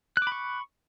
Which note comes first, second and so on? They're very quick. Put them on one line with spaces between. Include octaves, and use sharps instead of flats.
F#6 D6 B5 C#6